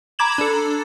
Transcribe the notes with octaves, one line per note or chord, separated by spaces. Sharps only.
A#5 B5 D6 G#6 E7 F#7
D4 A4